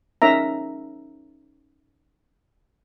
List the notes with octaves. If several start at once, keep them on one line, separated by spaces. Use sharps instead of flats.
C#4 D#4 A#4 E5 A#5